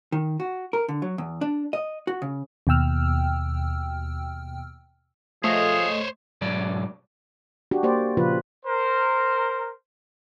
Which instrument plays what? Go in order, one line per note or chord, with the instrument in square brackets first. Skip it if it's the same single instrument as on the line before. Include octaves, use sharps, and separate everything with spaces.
[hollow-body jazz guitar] D#3
F#4
A#4
D3
F#3
E2
D4
D#5
F#4
C#3
[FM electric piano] D#2 B2 G5 E6 F6
[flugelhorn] F3 [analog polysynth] A3 D#5 [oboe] G#4 [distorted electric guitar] C5 C#5
[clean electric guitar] B1 G#2 F#3 D5
[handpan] D4 F#4 G4
A#3 G4 C5 D5
A#2 C#3 F3 F4 B4
[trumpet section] A#4 C5